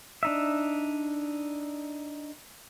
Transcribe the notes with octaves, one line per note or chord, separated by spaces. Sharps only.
D4 D#4 E5